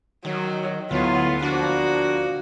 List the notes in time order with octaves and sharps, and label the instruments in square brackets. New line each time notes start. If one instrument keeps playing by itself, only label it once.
[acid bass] D#3 [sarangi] F#3
[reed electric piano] D2 [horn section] A2 F4 [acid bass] F#3 [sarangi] B3
[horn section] F3 A#3 [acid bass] D4 [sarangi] F#4